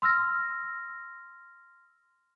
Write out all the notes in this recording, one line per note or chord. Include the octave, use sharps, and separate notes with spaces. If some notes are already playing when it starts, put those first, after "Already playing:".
C6 E6 F6 A#6